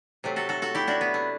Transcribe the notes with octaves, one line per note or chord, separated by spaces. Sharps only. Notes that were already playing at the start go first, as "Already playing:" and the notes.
C3 F#3 A3
F#4 A4
F#4 A4
F#4 A4
E4 G4
D4 F#4
B3
A3